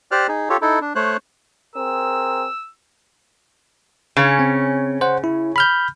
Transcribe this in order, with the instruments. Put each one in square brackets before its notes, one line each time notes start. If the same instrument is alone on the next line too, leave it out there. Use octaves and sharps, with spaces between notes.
[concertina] G4 C5 D5 F6 F#6
D#4 G#4
F4 G4 A4 C#5
D#4 E4 A4
D4
A3 C5 C#5 F#6
[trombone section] C4 G#4 A#4 [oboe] E6
[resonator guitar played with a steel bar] C#3 C#4
[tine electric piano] C4
C5 F#5
E4
B5 F6 G6